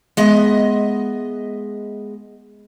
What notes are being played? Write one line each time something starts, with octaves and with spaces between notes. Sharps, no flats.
G#3 B3 D#5 E5